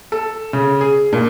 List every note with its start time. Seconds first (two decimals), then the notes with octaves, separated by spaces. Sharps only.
0.12 A4
0.53 C#3
0.81 G#4
1.13 A#2